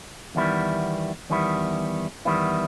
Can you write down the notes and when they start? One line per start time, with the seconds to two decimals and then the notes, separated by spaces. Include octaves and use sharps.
0.35 E2 D#3 G3 B3 E4
1.30 E2 D#3 G3 B3 E4
2.25 E2 D#3 G3 B3 E4